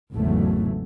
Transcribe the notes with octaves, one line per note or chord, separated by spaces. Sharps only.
G#1 E2 C#3 F#3 A3